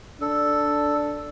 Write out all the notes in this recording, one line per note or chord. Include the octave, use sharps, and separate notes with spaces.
D4 A4